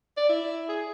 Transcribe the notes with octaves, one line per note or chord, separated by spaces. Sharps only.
D5
E4
G#4